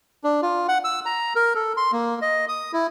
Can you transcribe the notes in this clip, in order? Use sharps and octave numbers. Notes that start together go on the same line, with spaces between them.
D4
F4
F#5
E6
A#5
A#4
A4
C6
A#3
D#5
D#6
E4